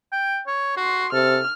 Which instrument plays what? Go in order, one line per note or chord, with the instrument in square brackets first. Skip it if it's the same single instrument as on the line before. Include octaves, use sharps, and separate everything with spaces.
[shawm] G5
C#5
[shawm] F#4 [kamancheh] C6
[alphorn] C3 [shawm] A4 [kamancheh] F6